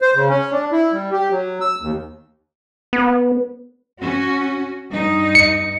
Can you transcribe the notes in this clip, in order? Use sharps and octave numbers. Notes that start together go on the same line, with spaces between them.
C5
C#3
C#4
D4
E4
G3
G4
F#3
E6
D#2
B3
C#4 F#4
G2 D#4
C#7